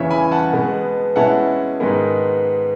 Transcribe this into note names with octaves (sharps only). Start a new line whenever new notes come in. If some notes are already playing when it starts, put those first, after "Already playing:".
Already playing: E2 C#3 E3 C#5 E5
G#5 B5
F#5 A5
B2 G#3 B3
B2 G#3 C#4 E4 F#5 A5
G#2 D#3 G#3 B3